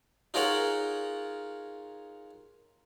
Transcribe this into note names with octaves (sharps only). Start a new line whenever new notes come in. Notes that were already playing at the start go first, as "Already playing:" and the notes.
D#4 F4 G#4 A#4 C#5 F#5